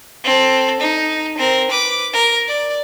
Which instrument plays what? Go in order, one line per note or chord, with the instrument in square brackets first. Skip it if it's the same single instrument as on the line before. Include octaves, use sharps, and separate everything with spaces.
[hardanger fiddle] C4 A4
D#4
C4 A#4
B4 D6
A#4
D5